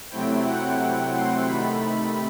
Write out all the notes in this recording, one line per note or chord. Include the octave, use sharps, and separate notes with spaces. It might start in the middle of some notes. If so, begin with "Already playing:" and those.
C3 F#3 A3 C4 E4 G5
F#5
C6
C3 D#3 A3 B5